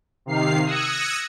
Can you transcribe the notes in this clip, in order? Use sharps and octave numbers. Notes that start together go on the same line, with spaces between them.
C3 D#3 F5 C7
D#6 E6 F#6 G#6 A#6 C#7